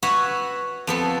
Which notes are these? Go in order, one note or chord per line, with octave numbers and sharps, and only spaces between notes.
F#4 B4 C#5 E5 F#5
F2 B3 A4